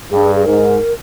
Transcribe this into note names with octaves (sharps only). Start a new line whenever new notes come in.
G2 G#4
G#4
G#2 A#4